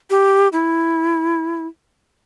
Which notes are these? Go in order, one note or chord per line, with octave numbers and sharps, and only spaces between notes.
G4
E4